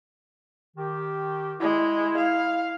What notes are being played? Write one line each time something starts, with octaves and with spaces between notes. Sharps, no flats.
D#3 G4
G#3 E4
F5